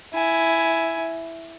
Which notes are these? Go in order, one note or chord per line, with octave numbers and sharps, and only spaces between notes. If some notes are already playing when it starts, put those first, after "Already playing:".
E4 G#5